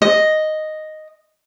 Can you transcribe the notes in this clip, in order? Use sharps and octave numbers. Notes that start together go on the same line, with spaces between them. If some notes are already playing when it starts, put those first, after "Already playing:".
D#5